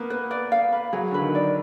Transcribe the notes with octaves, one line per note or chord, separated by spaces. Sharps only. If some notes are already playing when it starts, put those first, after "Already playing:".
Already playing: A#3 B3
B4
D5
F5
B4
F#3 G#4
D3 B4
D#3
D5